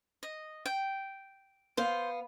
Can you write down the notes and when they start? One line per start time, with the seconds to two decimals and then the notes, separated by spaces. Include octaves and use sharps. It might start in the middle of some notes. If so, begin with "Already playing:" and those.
0.23 D#5
0.66 G5
1.77 B3 C5 F5